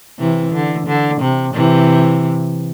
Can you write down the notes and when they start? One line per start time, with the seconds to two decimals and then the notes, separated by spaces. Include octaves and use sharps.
0.19 C3 E3
0.52 D3
0.87 D3
1.21 C3
1.54 C3 E3